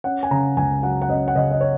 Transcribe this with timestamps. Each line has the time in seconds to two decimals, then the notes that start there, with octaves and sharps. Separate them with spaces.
0.04 C#4 F#5
0.23 G#5
0.31 C#3 A#5
0.57 C#2 G#5
0.83 F#3 F#5
1.02 F#5
1.08 C#4 D#5
1.28 F#5
1.35 C#3 D#5
1.51 D#5
1.61 C#5